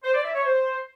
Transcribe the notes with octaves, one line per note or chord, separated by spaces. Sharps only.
C5
D5
E5
C#5
C5